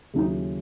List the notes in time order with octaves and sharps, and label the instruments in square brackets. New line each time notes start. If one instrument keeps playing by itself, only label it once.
[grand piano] D#2 C#3 F#3 C#4 E4 [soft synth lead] D#4